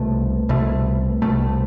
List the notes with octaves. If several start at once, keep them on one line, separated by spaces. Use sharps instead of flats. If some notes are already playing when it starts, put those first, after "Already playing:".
Already playing: C2 B2 A3
C2 B2 A3
C2 B2 A3